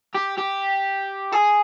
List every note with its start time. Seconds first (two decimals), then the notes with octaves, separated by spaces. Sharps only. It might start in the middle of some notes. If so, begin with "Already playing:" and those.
0.15 G4
0.38 G4
1.32 G#4